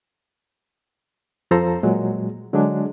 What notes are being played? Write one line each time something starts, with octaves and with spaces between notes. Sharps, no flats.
F2 F3 A4 C5 A#5
A#2 F#3 G#3
D3 F#3 G#3 D4